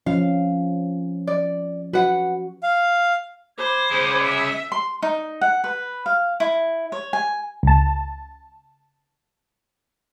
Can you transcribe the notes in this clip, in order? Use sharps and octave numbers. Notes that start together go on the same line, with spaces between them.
F3 C#4 F5
D5
F#4 B4 F#5
F5
C5 B5 D6 G#6
G#3 C#4
E5
C6
D#4
F#5
B4
F5
E4
C#5
G#5
C#2 A5